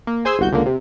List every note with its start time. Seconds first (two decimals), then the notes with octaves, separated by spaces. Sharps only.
0.07 A#3
0.25 G#4 C5 G#5 C6 E6
0.39 G1 C2 F#4 G6
0.52 C#2 D3 A#3
0.66 C3